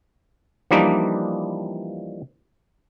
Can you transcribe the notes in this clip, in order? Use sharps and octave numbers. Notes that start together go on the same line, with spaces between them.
E3 F3 G3 A#3 D4 D#4